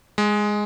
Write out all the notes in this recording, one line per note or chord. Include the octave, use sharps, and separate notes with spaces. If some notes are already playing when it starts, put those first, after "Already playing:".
G#3